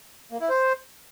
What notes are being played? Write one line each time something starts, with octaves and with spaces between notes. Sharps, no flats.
A#3
E4
C5